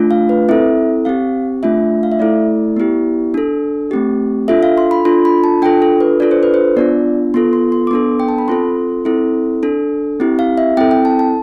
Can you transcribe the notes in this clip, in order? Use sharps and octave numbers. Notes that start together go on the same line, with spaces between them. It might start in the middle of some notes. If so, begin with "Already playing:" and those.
Already playing: A3 D4 F4
F5
B4
C4 E4 A4 E5
C4 G4 F5
A3 D4 F4 E5
F5
E5
A3 E4 A4 D5
B3 E4 G4
D4 A4
A3 C4 G4
D4 F4 A4 E5
F5
C6
B5
D4 F4 A4 C6
B5
A5
D4 F4 A4 G5
A4
B4
D4 F4 A4 D5
C5
B4
C5
B3 D4 F4 D5
B3 F4 A4 C6
C6
C6
D6
B3 D4 A4 C6
G5
A5
B5
C4 F4 A4 C6
C4 E4 A4
D4 A4
C4 E4 G4
F5
E5
C4 E4 A4 G5
G5
A5
A5